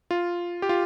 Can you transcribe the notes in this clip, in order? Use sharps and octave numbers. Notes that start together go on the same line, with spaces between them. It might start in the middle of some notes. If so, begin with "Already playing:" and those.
F4
G4
F4